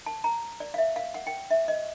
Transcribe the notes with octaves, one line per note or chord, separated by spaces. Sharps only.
A5
A#5
D5
F5
E5
F5
F#5
G5
E5
D#5